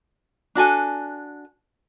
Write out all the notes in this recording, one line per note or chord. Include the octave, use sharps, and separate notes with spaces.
D4 F#4 A4 G#5